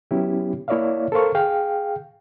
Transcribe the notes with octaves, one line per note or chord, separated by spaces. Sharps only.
F#3 B3 C#4 E4 G4
A#3 E4 C#5 D5 E5 F5
A4 A#4 C5 F5 C#6
G#4 F5 G5